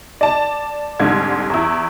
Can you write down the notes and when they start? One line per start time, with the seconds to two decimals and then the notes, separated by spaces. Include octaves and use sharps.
0.21 D5 A5
1.00 C2 G#2 D3 G#6
1.50 E2 E4